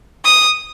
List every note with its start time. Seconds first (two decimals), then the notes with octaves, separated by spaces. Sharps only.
0.25 D#6